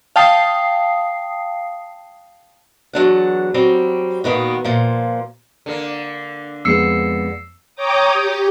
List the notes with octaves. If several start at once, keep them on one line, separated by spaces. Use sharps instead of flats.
F5 G5 A5 D#6 C7
E2 F#3 D4 F#5
F#3 G3 C4
A#2 D#3 B3 F#4
A#2 F3
D3 A#3
F2 G#3 B3 E6 C7 C#7
C#5 G5 A#5 D6 D#6
G4